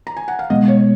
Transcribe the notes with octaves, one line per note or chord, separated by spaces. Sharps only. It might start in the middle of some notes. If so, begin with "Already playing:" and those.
A#5
G#5
F#5
F5
B2 G#3 B3 D#5
C#5